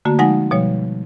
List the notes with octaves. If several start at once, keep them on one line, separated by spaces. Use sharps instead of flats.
D3 A3 A#3 F#4
F3 G#3 D#4 F#5 G#5 A#6
B2 F3 G3 C#5